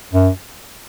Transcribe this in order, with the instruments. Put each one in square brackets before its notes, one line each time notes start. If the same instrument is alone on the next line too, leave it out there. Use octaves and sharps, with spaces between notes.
[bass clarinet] F#2